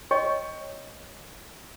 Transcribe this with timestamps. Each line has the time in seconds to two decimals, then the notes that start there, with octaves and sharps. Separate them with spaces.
0.11 C#5 D#5 G5 C#6